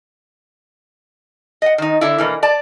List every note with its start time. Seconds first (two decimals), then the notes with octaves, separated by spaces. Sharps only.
1.62 D#5 F#5
1.78 D#3 D#4
2.01 D3 E4
2.18 B2 E3 A#3
2.43 D5 A5